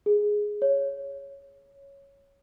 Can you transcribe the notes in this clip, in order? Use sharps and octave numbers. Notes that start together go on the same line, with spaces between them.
G#4
C#5